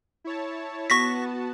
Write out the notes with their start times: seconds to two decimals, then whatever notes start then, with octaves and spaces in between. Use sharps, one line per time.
0.24 E4 C#5 A5
0.90 B3 F#4 A5 C#6 A#6 B6